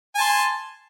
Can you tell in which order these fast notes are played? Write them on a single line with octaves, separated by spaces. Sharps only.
G#5 A5 C6